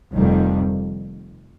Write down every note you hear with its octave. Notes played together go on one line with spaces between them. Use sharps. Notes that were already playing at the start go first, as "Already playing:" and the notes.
F1 F2 D#3 G3